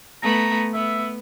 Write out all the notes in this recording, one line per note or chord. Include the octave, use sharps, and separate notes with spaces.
A3 B3 A#5
B3 E5